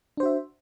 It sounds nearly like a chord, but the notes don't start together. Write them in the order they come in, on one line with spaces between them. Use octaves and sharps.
D4 C5 F#4 E5